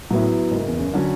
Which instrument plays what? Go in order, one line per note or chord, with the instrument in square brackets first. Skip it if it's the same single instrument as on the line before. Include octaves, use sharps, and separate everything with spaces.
[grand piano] A2 [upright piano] F#3 B3 E4
[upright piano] F#1 [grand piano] G#2
[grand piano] E2
F#2
[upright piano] D3 F#3 C#4